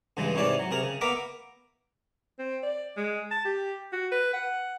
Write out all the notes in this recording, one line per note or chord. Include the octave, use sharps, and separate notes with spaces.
G2 C#3 E3 G#3
G#2 C3 E3 C#5 D5
F#3
C3 G#4 A#4
C#3
A#3 B3 A#4 E5 D6
C4
D5
G#3
A5
G4
F#4
B4
F#5